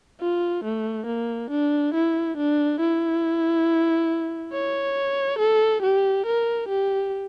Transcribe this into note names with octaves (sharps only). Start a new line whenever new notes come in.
F4
A3
A#3
D4
E4
D4
E4
C#5
A4
G4
A#4
G4